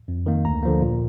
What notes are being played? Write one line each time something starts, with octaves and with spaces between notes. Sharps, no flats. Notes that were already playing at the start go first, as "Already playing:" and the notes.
F2
D#3 A#3
D2 A#5
D3 F3 A#3
A#2